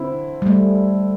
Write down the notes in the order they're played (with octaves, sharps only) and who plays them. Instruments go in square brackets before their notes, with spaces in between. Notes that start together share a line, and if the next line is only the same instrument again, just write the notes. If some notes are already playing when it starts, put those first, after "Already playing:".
Already playing: [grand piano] D3 C4 E4
[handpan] G3
A3